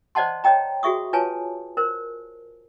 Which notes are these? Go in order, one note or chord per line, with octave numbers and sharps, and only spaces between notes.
C5 D5 D#5 F#5 A5 C6
C#5 D#5 G5 A#5
F#4 G#4 E5 C#6 D#6
F4 B4 C#5 G#5 A5
A#4 C5